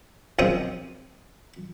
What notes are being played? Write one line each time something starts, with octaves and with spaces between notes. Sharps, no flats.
A#1 C#3 C4 D#5 G5 D#6